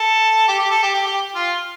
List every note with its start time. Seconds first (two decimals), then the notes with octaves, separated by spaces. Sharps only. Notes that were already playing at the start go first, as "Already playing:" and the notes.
Already playing: A4
0.48 G4
0.59 G4
0.71 A4
0.83 G4
0.94 G4
1.06 G4
1.35 F4